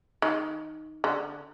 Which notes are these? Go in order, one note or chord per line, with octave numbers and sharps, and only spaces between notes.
D#3
D3